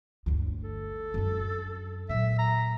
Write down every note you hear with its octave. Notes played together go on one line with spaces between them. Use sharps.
G1 D2
A4
F#2 D4
A#2 F#3 E5
A#5